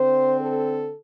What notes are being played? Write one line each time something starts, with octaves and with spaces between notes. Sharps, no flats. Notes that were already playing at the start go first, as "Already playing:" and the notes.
Already playing: D3 C4 C5
A4